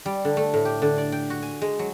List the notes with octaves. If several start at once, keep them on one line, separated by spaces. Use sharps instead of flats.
G3
D3
A3
A2
G4
D3
D5
G5
F#4
G#5
G#3
F#3